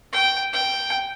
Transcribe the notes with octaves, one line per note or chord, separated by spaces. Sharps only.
G5
G5